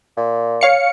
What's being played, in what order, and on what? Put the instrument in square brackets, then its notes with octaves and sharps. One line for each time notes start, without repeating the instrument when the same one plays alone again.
[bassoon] A#2
[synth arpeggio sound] C#5 F5 C#7